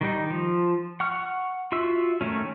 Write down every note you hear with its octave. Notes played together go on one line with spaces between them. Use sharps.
D#3 G3 D#4
F3
F#5 C#6 F6
F4 F#4 E5 E6
D#3 A3 C#4